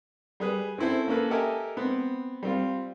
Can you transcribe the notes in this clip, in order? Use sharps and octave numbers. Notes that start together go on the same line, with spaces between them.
G3 G#4 B4
C4 C#4 E4 A4 C5
A#3 C#4 A4 B4
G4 A4 A#4 D#5 E5 G#5
B3 C4
G3 C4 F4